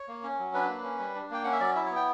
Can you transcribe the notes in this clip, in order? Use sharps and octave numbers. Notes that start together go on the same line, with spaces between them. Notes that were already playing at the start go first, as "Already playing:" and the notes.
Already playing: C#5
A#3
C#4
F#3
D4 B4
A#3
C#4
G3
D4
A#3 G5
C#4 F#5
E5
F#3 D5
E4 E5
C#5
B3
G5